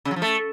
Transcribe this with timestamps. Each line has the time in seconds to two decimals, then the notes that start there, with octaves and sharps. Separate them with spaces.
0.05 C#3
0.11 F#3
0.16 F3
0.22 A3